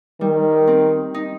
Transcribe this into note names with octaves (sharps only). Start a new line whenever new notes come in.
D#3 G3
C4
D#4